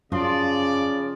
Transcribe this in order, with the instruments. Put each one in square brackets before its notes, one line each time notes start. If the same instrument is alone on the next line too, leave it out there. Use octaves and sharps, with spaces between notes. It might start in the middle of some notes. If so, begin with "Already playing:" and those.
[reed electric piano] F#2 C6 [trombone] C#3 [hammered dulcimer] F3 [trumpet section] D5